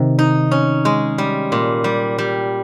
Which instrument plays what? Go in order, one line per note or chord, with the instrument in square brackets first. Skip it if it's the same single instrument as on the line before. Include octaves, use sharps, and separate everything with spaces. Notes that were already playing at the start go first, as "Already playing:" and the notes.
Already playing: [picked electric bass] C3 D#3
[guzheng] D#4
C#4
G#3
G3
A#2
G3
G3